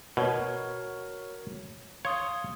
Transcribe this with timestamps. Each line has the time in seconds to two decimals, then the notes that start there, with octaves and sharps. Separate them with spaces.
0.17 B2 F#4 A#4 C#5
2.05 C#5 F5 C6 D#6